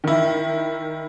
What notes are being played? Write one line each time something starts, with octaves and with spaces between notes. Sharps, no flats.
D#3 E4